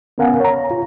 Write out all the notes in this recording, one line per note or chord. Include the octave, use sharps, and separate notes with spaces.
B3 C#4 A#4 F5 F#5 G#5
C#5 A#5
F4